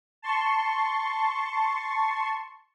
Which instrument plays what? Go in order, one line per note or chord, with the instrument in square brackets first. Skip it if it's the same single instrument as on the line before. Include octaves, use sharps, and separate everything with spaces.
[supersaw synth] A5 C6 C#6